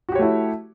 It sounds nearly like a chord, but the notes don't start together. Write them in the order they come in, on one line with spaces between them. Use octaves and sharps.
F#4 G4 C#5 A3 E4